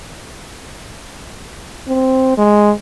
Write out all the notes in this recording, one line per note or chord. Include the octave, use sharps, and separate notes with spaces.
C4
G#3